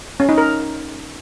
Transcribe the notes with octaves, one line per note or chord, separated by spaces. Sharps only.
C#4
D#4
A#4